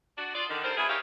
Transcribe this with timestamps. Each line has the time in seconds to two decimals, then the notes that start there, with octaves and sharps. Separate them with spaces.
0.17 D4 F#4
0.34 F4 G#4 D5
0.49 D3 D#3
0.62 G2 D#3 C4 A#4 C5
0.77 F#3 B3 E4 G#4
0.89 D#4 G4 A#4 C#5 E5 F5